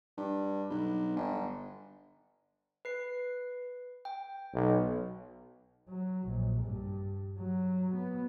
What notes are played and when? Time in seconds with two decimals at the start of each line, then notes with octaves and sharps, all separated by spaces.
0.17 G2
0.70 B1
1.16 G1
2.85 B4 C7
4.05 G5
4.54 B1
5.89 F#3
6.28 A#1
6.63 G2
7.38 F#3
7.95 B3